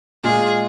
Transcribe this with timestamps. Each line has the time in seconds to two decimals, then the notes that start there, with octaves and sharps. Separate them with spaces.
0.24 A#2 G#3 F4 G#4